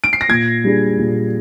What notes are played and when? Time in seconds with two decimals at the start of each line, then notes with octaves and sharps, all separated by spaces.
0.04 D7
0.13 C7
0.21 A#6
0.29 A#2 G#6
0.64 G3 D4 G#4
0.98 A#2